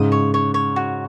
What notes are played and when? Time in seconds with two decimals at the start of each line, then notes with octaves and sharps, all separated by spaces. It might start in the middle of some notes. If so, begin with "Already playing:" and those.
Already playing: G#2 C#3 D#6
0.12 C#5
0.34 C#5
0.54 C#5
0.76 F#4